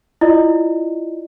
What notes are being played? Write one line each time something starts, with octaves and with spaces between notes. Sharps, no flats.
E4 F4 D5 D#5